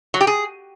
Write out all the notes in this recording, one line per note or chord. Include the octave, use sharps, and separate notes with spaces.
F#3
G4
G#4